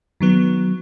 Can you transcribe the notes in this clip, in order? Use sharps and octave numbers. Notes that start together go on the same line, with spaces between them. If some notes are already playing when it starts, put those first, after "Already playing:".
D#3 F#3 B3